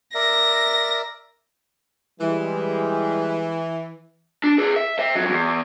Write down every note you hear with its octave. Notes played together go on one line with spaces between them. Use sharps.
A#4 D5 E5 A#6
E3 G3 G#3
D4
G#4 B4
E5
C5 E5
F2 F#3
E2